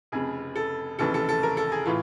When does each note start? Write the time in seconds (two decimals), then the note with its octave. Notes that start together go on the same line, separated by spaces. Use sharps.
0.12 F1 F2 C#3 G#4
0.56 A4
0.99 F1 D#2 C#3 E3 A4
1.14 A4
1.29 A4
1.43 A#4
1.57 A4
1.72 G#4
1.85 A2 E3 F4